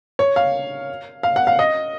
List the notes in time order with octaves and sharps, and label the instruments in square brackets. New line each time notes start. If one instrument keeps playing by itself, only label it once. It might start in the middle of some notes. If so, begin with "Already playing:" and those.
[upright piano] C#5
F5
F5
F#5
F5
D#5